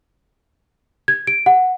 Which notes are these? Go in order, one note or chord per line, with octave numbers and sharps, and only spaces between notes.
G#6
D7
F#5